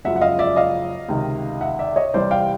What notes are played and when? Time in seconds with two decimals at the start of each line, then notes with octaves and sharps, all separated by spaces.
0.05 F#1 F#2 C#3 F3 G#3 E5 F#5
0.16 F#5
0.21 D#5 F5
0.39 D5 E5
0.56 D#5 F5
1.09 C#2 C3 D#3
1.61 E5 F#5
1.79 D5 E5
1.96 C#5 D#5
2.13 C2 C3 E3 G3 C5 D5
2.31 F5 G5